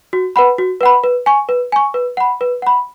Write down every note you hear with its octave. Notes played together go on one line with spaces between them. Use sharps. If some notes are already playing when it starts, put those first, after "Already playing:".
F#4
B4 F#5 B5
F#4
B4 F#5 B5
B4
G#5 C#6
B4
G#5 C#6
B4
F#5 B5
B4
F#5 B5